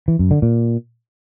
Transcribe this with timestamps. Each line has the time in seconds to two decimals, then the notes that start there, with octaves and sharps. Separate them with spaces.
0.08 E3
0.19 F#2
0.31 D3
0.42 A#2